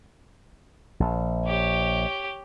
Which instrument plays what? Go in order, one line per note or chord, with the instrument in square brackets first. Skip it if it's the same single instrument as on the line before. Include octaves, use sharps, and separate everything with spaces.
[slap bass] A#1
[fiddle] G4 C#5